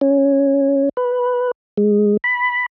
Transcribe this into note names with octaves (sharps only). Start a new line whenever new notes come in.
C#4
B4
G#3
B5